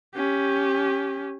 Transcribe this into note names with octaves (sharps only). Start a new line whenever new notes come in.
C#4 G4